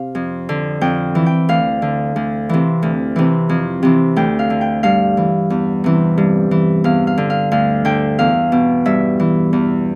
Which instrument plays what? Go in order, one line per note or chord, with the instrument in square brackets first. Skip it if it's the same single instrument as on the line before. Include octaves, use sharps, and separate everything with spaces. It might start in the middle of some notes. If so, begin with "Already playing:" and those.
Already playing: [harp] C3 F5
F2
D3
F2 G5
E3
G5
D2 F5
D3
D2
C3 E3
D2
C3 E3
F2
C3 E3
D2 G5
F5
D3
G5
G2 F5
E3
E2
C3 E3
G2
E3
E2 F5
F5
D3
F5
D2 F5
D3 G5
E2 F5
B2
G2 E5
E3
E2